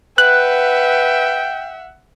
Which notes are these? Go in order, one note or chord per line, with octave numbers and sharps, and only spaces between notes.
B4 E5 F#5 G5 F#6